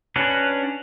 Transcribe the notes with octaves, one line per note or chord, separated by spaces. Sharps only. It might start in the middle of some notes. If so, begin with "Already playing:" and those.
C#4 D4 F#4 B4